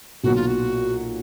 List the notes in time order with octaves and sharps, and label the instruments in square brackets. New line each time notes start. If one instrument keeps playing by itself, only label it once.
[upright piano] B1 A#2 F#3 [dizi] F#4
[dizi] F4
F#4